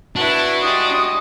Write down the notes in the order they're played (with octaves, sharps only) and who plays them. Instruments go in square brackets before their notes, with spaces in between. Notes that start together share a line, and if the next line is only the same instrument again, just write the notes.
[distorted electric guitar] D4 [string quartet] E4 B4 [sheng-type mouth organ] F#4
[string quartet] G3 G#3 [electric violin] D#6